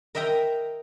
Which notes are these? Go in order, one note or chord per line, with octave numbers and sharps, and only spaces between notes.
A#4 D#5 E5 G5 A#5